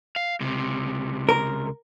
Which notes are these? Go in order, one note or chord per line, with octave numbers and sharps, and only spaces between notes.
F5
C#2 C3
A#4